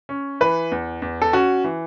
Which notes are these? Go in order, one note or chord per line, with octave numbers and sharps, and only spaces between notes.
C#4
E3 B4
E2
E2
A4
C#4 F#4
E3